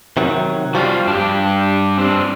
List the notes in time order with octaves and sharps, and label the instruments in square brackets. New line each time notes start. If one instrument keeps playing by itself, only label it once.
[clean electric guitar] C3 D#3 F#3
[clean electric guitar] F3 G3 [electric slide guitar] F#4 F5
[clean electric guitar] G2 [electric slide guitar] D4 G4
[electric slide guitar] C4 D4